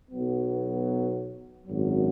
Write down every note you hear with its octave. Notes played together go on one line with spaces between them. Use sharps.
B1 B2 F#3 B3
G#1 F#2 F#3